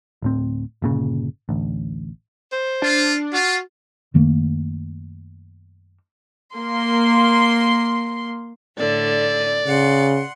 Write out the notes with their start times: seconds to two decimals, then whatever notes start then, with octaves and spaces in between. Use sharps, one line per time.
0.22 D1 A2 C4
0.82 G1 A#2 C#3
1.49 A1 D2
2.52 C5
2.82 D4 F4
3.32 F4 F#4
4.14 F#2 D#3 A3 A#3
6.54 A#3 C6
8.78 A2 D3 D5
9.66 C#3 F#5 C6